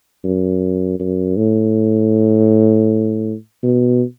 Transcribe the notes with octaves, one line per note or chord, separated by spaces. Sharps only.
F#2
F#2
A2
B2